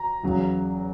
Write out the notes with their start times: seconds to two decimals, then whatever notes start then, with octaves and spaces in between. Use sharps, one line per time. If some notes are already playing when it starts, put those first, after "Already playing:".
Already playing: A#5
0.23 E2 C#3 F#3